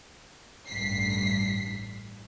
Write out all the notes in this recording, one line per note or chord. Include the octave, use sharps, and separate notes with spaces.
A1 G2 B6 C7